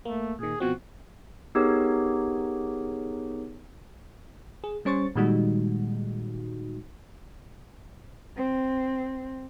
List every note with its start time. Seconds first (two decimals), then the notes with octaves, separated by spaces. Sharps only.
0.05 A3 A#3
0.39 A#2 D#3 G#4
0.60 B2 F3 C4 F#4
1.55 B3 D#4 G4 G#4 A#4 C#5
4.64 G#4
4.85 G3 C#4 C5 C#6 A6
5.15 A#2 D#3 G3 G#3 D#4 F#4
8.37 C4